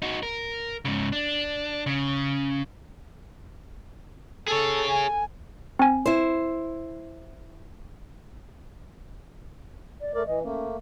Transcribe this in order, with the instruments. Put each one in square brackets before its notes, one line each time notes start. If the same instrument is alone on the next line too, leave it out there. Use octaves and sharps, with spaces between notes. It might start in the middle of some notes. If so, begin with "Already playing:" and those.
[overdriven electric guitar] D#4 F#4
A#4
G#2 C#3
D4
C#3
[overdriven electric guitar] G#4 C#5 [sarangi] A4
[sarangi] G#5
[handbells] C4 G#5
[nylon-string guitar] E4 C5
[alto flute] D5
[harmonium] A3 D5 [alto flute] A#4
[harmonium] E3 [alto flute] D#5
[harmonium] A3 A#3 [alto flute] C#4